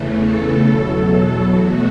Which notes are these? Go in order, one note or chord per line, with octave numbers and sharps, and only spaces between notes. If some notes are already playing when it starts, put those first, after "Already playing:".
Already playing: E2 C#3 E3 A3
A4
E2 B2 F#3
B2 A3 F#4